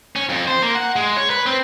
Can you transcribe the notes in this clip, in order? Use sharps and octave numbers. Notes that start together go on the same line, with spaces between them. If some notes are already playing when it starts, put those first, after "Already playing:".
C#4
F2
C5
A#3
F#5
G#3
C#5
B4
C4